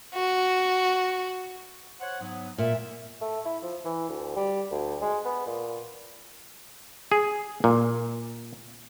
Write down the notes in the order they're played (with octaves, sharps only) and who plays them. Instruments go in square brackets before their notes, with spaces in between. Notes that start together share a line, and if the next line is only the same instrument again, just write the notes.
[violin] F#4
[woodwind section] C5 C#5 F#5
G#2 F#3 B3
[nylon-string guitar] A#2 [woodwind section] E5
[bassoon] A3
E4
F3
E3
D2
G3
D2
G#3
B3
A#2
[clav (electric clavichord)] G#4
A#2